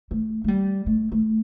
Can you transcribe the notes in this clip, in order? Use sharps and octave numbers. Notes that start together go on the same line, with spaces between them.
A3
A3
G3
A3
A3